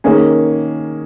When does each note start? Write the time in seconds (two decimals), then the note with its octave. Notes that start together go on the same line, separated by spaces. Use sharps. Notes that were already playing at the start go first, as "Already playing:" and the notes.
0.04 D#3 A#3 C#4 G#4